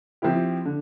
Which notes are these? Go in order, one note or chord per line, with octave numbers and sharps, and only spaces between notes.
F3 C4 E4 G4
D3